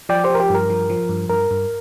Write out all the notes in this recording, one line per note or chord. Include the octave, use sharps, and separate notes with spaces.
F3 D5 G5
G4 C5
F3 A#4
G4
G2 A#4
F3
F3
G2
G2 A#4
G2